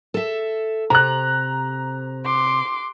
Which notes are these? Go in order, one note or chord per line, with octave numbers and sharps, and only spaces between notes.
A4 E5
C3 A#5 F#6
C6 D6